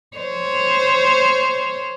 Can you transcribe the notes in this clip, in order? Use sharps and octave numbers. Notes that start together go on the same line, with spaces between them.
C5 C#5